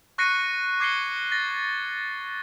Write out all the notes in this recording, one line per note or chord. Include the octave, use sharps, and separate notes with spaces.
C#6 F#6 A#6 C7 C#7 D#7
D6 G#6 C7 C#7 G7
A6 A#6